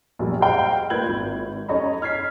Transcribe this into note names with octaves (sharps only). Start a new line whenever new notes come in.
A#1 F#2 G3
G4 G#4 C5 D#5 F5 G5
A#3 F4 B4 G6 G#6 F#7
G#1
C#4 A4 C#5 D#5 A#5 B5
F6 G#6 B6 C7